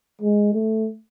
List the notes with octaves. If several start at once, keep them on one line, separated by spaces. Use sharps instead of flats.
G#3
A3